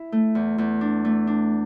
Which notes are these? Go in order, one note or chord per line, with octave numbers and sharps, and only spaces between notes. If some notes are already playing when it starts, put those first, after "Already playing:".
Already playing: E4
A3
E2
E2
D4
A3
D4